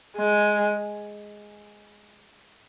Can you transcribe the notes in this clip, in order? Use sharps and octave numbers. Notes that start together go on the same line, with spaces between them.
G#3